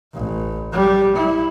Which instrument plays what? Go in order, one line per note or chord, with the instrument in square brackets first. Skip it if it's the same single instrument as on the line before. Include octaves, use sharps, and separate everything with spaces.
[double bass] A1
G3
E4